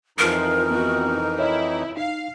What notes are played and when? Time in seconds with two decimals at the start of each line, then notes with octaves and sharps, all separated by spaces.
0.19 F2 E3 F3 D#4 A#4
0.71 B3 C4 F4 F#4
1.39 E4 C#5 D#5
1.97 D#4 F5